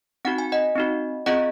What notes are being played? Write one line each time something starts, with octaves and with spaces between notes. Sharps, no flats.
C4 D#4 F#4 F#5
G#5
D#5 F#5
C4 D#4 F#4
C4 F4 G#4 D#5 F#5